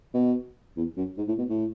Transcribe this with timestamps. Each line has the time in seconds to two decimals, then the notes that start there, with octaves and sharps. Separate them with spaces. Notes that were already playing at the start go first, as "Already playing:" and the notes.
0.14 B2
0.76 E2
0.97 F#2
1.18 G#2
1.28 A2
1.38 B2
1.49 A2